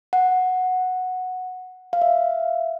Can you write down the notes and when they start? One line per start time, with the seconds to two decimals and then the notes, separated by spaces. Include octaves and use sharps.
0.13 F#5
1.93 F5
2.02 E5